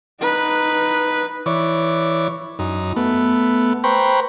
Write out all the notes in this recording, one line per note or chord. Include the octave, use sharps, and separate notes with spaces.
D#4 B4
E3 C#5 D5
F#2 D#4
A3 B3
B4 C5 G5 A#5 B5 C#6